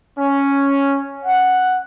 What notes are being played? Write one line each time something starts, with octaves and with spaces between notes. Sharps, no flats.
C#4
F#5